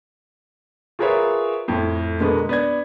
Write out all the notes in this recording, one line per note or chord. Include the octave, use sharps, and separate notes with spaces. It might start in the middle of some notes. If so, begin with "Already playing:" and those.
F4 G#4 A#4 B4 C#5 E5
F2 A2
B2 D3 G#3 A#3 B3
B3 D4 G#6